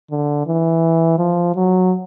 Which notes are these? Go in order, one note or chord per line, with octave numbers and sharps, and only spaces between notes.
D3
E3
F3
F#3